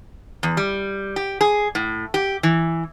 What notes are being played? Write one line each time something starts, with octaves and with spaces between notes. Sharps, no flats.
E2
G3
G4
G#4
A2
G4
E3